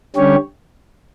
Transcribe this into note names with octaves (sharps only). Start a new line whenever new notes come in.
D3 G3 C#4 G4 C#5